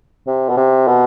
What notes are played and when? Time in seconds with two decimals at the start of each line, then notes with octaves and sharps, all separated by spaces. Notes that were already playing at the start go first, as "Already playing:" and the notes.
0.27 C3
0.49 B2
0.57 C3
0.87 B2